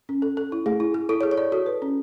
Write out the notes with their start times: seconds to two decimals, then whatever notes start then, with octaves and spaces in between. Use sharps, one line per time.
0.09 C#4
0.22 A4
0.37 A4
0.52 E4
0.66 A3 G#4
0.80 E4
0.94 G#4
1.09 E4 A4
1.21 G#4 C#5
1.31 C#5
1.37 D5
1.52 F#4 A4
1.66 B4
1.82 C#4